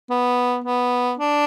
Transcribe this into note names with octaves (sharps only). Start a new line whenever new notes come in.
B3
B3
D4